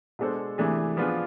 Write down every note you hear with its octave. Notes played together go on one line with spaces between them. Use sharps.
B2 G#3 D4 A4 C5
C3 E3 A3 D4 G#4
F3 B3 D4 F4 G#4